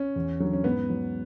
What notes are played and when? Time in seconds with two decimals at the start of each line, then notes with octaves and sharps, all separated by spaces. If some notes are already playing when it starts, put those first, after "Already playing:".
Already playing: C#4
0.16 E2
0.40 D3 F#3
0.53 C#4
0.64 G#2 B3
0.90 F#3